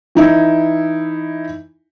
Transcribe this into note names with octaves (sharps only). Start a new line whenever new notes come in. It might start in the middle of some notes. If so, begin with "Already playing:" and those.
E3 D#4 E4